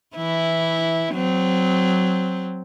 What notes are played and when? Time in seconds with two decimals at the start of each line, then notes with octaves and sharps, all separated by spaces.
0.17 E3 E4
1.13 F#3 C4